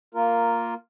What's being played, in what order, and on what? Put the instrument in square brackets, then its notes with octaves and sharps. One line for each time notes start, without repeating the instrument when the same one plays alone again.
[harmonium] A#3 F4 A#4